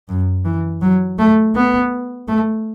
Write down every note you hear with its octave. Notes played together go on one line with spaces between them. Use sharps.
F#2
E3
F#3
A3
B3
A3